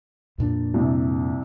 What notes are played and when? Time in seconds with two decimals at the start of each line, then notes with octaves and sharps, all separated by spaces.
0.38 F2 A#2 D4
0.74 C2 C3